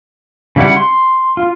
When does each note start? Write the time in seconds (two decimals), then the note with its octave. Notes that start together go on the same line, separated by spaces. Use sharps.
0.56 C#3 G3 E4 G4 F#5
0.77 C6
1.37 F4